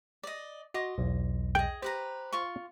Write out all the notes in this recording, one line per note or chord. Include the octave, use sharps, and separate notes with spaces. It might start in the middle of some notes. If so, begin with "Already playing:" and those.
D5 D#5
F#4 D#5 C6 D6
B1 E2
G#4 D#5 G5
G4 B4 C5 A#5
F4 C6 C#6